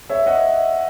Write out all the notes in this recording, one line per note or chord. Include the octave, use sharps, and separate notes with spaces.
C#5 E5
D#5 F#5